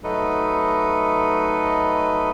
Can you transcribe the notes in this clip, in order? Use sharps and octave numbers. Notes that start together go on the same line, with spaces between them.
F#3 A3 D#4 A4 B4 D#5